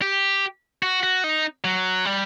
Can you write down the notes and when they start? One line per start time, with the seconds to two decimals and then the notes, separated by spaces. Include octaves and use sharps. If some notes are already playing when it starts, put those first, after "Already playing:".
0.02 G4
0.82 F#4
1.03 F#4
1.24 D#4
1.64 F#3
2.05 G3